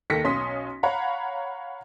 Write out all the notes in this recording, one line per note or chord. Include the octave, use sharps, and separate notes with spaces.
D#2 D#3 A4 A#6 B6 C#7
B1 C#4 C6 D#6 B6
C#5 F5 F#5 A#5 B5